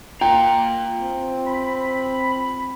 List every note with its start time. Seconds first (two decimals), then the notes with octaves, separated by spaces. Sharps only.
0.21 F4 G5 A#5
0.99 C4
1.46 B5